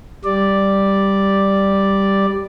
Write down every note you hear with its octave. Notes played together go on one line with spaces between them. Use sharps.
G3 D5